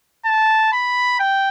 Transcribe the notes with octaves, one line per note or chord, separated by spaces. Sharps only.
A5
B5
G5